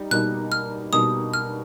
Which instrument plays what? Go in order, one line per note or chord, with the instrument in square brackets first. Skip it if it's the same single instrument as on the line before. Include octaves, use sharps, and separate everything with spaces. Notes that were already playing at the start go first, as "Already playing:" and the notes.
Already playing: [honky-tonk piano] G3 D#4
[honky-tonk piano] B2 G3 A#3 D#4 [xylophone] F#6
[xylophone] F6
[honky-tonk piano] B2 G3 A#3 D#4 [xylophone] D#6
[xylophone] F6